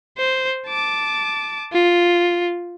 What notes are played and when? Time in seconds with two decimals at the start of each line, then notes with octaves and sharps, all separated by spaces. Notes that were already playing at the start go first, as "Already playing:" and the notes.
0.17 C5
0.67 A5 D6
1.73 F4